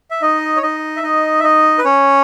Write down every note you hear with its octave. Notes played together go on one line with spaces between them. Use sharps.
E5
D#4 D#5
C#5
D#4 D#5
E5
D#4 D#5
E5
D#4 D#5
B4
C#4 C#5